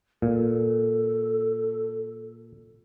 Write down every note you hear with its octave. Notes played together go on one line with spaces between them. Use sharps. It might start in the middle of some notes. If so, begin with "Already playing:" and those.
A#2 A4